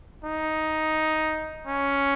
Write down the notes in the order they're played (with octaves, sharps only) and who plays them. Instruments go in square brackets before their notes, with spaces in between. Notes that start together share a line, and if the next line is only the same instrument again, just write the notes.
[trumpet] D#4
C#4